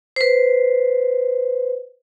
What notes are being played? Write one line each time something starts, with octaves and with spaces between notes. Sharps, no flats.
B4 C5